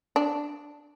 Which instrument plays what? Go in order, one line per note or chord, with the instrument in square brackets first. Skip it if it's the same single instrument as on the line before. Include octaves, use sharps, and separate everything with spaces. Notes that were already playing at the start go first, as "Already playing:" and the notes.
[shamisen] D4